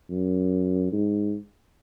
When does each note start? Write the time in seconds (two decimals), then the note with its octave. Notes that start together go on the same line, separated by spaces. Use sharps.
0.11 F#2
0.93 G#2